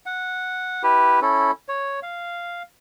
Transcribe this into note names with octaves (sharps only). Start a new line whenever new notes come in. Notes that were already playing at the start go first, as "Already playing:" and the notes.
F#5
E4 G4 B4
C#4 E4 A4
C#5
F5